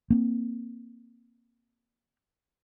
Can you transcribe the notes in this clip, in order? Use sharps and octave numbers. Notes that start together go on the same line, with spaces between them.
A#3 C4